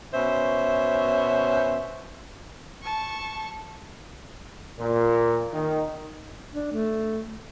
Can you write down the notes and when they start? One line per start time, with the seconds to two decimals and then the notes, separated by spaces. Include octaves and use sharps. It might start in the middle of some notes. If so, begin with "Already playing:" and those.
0.13 B2 C#4 C5 E5
2.82 A5 C#6
4.79 A#2
5.53 D#3
6.54 D4
6.72 A3